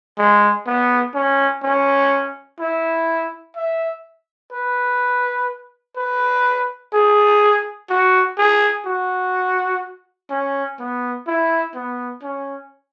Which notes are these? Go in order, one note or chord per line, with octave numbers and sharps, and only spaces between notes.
G#3
B3
C#4
C#4
E4
E5
B4
B4
G#4
F#4
G#4
F#4
C#4
B3
E4
B3
C#4